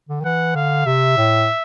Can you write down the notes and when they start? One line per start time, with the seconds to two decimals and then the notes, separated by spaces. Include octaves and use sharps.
0.09 D3
0.20 D#3
0.24 E3 F#5
0.55 D3 F5
0.86 C3 E5
1.17 A2